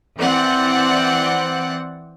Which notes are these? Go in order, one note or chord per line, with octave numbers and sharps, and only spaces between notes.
E3 C4 D5 F#5